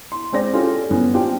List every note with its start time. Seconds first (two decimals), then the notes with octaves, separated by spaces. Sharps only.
0.12 C6
0.32 G#3 C4 D5 A#6
0.53 C#4 F4 G4 A4
0.90 G1 B3 C#4
1.13 C4 D4 F4 G4 G5